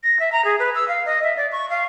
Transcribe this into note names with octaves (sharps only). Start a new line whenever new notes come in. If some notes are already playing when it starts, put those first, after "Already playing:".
A#6
E5
A#5
G#4
B4
E6
F5
D#5
E5
D5
C#6
F5